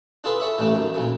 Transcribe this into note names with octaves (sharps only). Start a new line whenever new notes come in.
D4 F4 G#4 A4 B4
A4 C#5 E5 B5
A1 C#3 A3 D4 D6
F#2 D#3
A#1 C#3 F#3